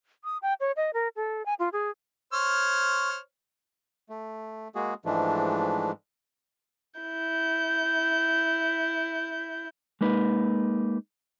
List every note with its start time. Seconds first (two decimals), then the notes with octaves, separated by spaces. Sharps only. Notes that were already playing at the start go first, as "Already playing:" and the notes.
0.24 D#6
0.42 G5
0.60 C#5
0.76 D#5
0.93 A#4
1.16 A4
1.46 G#5
1.59 F4
1.73 G#4
2.33 C5 C#5 F6
4.09 A3
4.75 G#3 A#3 F#4 G#4
5.05 G#2 E3 F3 G#3 A3 D4
7.01 E4 G6
10.01 G#3 A#3 D#4 B4